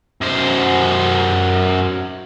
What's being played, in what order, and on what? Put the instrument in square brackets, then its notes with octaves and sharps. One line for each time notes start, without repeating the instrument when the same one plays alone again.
[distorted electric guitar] F#2 C5